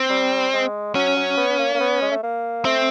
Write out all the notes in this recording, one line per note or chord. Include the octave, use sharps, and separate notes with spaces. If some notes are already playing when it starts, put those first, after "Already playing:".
Already playing: C4
G3
G#3
F#3 C#4
F#3
B3
A#3
A#3
B3
G#3
A3
A#3
A3 C4